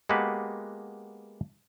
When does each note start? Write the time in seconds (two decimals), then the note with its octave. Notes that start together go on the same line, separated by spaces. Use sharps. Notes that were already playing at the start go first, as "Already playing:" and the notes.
0.09 G#3 A#3 B3 F#4 G4 B4